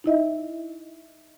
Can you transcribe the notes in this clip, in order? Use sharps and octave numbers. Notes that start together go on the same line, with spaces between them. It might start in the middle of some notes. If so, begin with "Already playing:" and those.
D#4 E4 D#5 E5